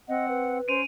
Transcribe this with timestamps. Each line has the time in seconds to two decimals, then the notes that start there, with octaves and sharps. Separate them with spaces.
0.08 C4 D#5 F#5
0.29 B4
0.68 C#4 C5 D7 D#7 F7